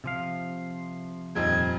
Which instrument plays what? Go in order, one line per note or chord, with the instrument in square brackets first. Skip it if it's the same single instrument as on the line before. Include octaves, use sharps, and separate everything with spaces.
[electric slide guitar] C3 F3 F5
[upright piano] D#1 F2 D#4 [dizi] G#6